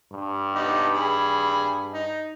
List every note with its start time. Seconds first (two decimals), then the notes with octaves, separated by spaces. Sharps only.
0.12 G2
0.55 B3 D#4 G4
0.93 G#4 B5
1.94 D#4